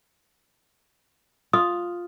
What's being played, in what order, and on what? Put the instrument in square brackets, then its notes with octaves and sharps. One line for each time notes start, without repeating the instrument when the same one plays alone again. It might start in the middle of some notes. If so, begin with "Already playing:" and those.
[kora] F4 [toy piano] D#6